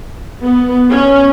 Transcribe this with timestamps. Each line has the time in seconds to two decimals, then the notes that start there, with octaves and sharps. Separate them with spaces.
0.42 B3
0.91 C#4